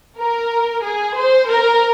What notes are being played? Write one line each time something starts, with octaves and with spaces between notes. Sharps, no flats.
A#4
G#4
C5
A#4